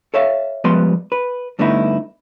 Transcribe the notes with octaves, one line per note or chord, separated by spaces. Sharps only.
A4 C#5 E5 F5
F3 G3 G#3 B3 B4 C6
B4
G2 D3 A3 B3 D#4 E4